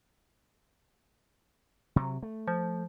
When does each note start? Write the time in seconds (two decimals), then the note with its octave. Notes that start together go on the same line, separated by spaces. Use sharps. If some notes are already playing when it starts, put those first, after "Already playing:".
1.96 C3 F#3
2.23 A3
2.48 F3